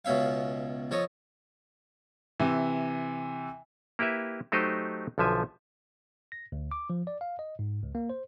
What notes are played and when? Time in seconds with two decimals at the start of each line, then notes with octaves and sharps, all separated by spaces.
0.05 C#2 B2 C#4 E5 F5
0.91 F3 A4 C#5 D#5
2.40 C3 E3
3.99 A#3 E4 G4 B4 E5
4.52 F#3 A3 D#4 G4 C5 D#5
5.18 B1 D3 F3 E5 G#5
6.32 A#6
6.52 D2
6.71 D6
6.90 F3
7.07 D5
7.21 F5
7.39 D#5
7.59 G#2
7.83 C#2
7.95 A#3
8.10 C5